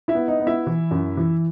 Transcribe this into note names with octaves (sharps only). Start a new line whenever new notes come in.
E4 E5
B3
D#4 D#5
B3
E4 E5
E3
F#2
E3